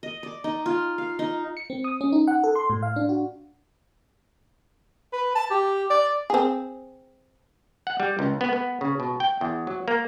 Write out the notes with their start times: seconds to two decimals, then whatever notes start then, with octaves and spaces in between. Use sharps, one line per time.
0.03 D#5
0.23 D5
0.44 D#4
0.66 F4
0.98 F5
1.19 D#4
1.57 C#7
1.70 C4
1.84 D#6
2.01 C#4
2.13 D#4
2.28 F#5
2.44 A4
2.56 C6
2.70 A2
2.83 F5
2.96 D4
3.09 F#4
5.13 B4
5.35 A5
5.50 G4
5.90 D5
6.30 C4 G#4
7.87 F#5
8.00 G3
8.19 C#2
8.41 B3
8.53 B3
8.81 C#3
9.00 B2
9.20 G5
9.41 E2
9.67 F#3
9.88 A#3